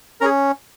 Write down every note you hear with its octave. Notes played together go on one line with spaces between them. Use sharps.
C#4 G#4 A#4 A#5